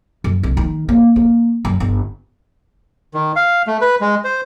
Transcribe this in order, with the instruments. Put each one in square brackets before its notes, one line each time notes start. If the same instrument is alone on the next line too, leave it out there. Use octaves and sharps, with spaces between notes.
[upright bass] F#2
C2
D#3
A#3
A#3
F#2
G1
[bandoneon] D#3
F5
A3
B4
G#3
C5